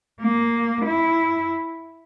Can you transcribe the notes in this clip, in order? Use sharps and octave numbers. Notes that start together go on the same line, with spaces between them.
A#3
E4